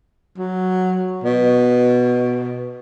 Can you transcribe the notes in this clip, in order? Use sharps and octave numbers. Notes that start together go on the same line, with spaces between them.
F#3
B2